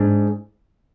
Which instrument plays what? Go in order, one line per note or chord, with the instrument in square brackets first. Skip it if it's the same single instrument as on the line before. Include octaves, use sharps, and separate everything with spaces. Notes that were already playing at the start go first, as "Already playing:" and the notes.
Already playing: [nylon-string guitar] G#2 G#3 D4